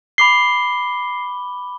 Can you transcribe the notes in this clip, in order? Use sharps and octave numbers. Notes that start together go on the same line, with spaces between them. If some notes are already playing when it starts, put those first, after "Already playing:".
B5 D6 C7 G7